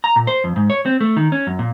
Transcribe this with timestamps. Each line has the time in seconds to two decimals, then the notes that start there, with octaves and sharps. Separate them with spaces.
0.04 A#5
0.16 A#2
0.27 C5
0.44 F2
0.56 G#2
0.70 C#5
0.86 C4
1.01 A3
1.16 D#3
1.32 C#4
1.47 F#2
1.59 A#2